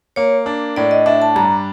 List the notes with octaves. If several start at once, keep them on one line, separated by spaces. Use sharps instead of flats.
A#3 C#5
D4
A2 D5
D#5
D4 E5
A5
G2 A#5